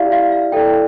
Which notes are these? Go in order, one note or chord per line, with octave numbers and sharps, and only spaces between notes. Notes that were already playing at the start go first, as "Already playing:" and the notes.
Already playing: E4 G4 D5 E5 F5
F5
F5
E4 A4 D5 G5